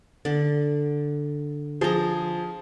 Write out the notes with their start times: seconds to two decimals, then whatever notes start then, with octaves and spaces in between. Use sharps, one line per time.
0.25 D3 D5
1.81 F3 G#4 C5 A#5